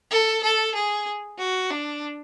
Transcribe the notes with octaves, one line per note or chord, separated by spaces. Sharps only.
A4
A4
G#4
F#4
D4